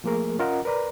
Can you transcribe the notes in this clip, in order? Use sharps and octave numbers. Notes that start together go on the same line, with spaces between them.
F3 A3 A#3 G#4 A#4
C#4 F4 A#4 D#5 F#5 A#5
A#4 B4 D5 A#5